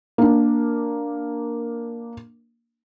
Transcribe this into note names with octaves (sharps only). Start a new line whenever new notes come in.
A#3 D4